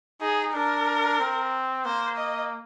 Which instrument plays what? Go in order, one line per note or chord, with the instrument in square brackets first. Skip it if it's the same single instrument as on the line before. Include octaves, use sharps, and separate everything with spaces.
[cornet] D#4 [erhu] G#4
[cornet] D4 [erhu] A#4
[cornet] C4
[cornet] A#3 [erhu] C5
[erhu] D#5